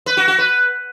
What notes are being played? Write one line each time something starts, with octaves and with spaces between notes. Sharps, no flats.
B4
F#4
F#4
B4